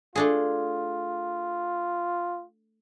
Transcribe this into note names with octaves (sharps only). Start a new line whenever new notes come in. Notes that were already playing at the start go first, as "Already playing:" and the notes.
A3 D4 F4 G#4